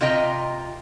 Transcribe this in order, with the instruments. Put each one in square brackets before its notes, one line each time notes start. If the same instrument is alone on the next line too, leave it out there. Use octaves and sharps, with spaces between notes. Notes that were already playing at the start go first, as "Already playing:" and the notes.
[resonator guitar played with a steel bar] C3 F4 D#5 G5 A#5